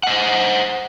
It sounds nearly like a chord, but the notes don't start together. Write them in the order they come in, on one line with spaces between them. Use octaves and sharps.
F#5 D#5 C5